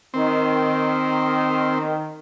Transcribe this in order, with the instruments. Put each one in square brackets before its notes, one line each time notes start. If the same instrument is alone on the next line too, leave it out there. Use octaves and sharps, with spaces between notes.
[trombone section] D#3 [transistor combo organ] C4